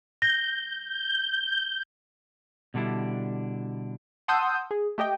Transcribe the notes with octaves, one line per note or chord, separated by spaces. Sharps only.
G6 A#6
B2 D3 G3 D4 E4
F#5 A5 C6 D#6 E6 G6
G#4
A3 G4 D#5 G5